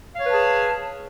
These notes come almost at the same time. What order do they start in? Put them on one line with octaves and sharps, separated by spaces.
F5 C#5 B4 A5 G#4